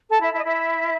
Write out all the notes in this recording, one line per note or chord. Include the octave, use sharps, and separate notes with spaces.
A4 A5
E4 E5
E4 E5
D#5
E4 E5